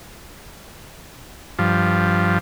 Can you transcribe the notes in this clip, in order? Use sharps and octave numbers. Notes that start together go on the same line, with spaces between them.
G2 F3